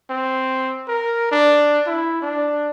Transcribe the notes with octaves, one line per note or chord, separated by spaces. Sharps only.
C4
A#4
D4
E4
D4